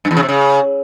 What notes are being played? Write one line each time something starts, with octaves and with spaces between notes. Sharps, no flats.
G2
E2
C#3
C3
C#3